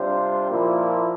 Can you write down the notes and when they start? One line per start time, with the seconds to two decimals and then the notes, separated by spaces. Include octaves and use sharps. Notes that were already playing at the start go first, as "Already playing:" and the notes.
Already playing: C3 G3 D4 F4 C5
0.48 A#2 F3 A#3 E4